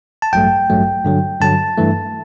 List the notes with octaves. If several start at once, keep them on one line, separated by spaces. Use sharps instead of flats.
A5
A1 G2 F#3 A3 G5
A1 G2 F#3 A3
G2 D3 F#3
G2 D3 F#3 A5
G2 E3 A3